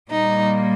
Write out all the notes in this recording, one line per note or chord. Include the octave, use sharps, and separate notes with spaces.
A#2 G3 A#3 D#4